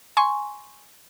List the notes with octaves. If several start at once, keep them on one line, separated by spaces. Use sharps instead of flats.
G#5 C6 C#6